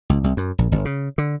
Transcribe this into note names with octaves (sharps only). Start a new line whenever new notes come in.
C#2
C2
F#2
A#1
G1
C#3
D3